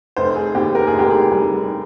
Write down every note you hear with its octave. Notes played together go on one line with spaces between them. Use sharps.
F1 C5
G#4
D#2 G4
A#4
G#4
F1
G4
G#4
G3